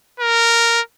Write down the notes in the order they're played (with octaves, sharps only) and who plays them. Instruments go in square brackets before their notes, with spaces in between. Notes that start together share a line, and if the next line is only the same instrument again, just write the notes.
[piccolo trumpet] A#4